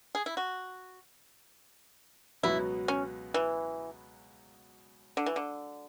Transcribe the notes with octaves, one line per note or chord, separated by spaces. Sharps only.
G#4
E4
F#4
C#2 B2 F#3 B3 E4 F#4
C#4
E3
D3
E3
D3